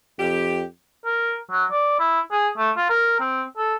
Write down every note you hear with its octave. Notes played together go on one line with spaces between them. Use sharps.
F2 G4
A#4
F#3
D5
E4
G#4
A3
F4
A#4
C4
A4